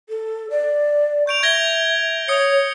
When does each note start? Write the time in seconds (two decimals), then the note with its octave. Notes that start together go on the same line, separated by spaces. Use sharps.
0.09 A4
0.50 D5
1.27 C#6 G6 D7 F7
1.43 E5 G#6 A#6 G7
2.28 C#5 D#6 C#7 F#7